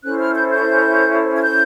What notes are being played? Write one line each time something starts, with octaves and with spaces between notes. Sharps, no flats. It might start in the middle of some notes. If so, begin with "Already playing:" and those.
C#4 E4 A4 C5 F#6
F6
G6
G6
G#6
G6